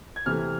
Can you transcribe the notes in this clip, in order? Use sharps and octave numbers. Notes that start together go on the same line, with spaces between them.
G#6
C3 E3 A3 F6